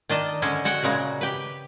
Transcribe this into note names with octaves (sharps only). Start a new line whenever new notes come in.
D#3 D4 D#5 A5
D3 G#3 C#4 C5 G#5
G#3 F#4 C#5 F#5 G5
A#2 C#3 G#3 A#5
G4 B4